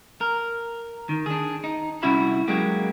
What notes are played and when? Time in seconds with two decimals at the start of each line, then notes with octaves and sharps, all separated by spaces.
0.21 A#4
1.09 D#3
1.26 D4 G#4
1.64 D#4
2.03 C2 C#4 E4 F#4 E5 B5
2.48 F#3 G#3 A#3 F#4 G4